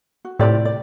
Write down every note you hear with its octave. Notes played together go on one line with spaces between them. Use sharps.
F#4
A2 C3 F4 G4 D5
D5